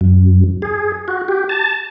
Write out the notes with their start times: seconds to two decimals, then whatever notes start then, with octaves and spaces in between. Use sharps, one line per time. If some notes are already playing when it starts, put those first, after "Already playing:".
0.01 F#2
0.62 G#4
1.08 F#4
1.28 G4
1.49 A5